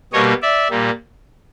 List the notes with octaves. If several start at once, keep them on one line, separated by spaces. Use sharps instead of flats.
B2 G3 A#3 C#5 D#5
D5 E5
A#2 G3 A#3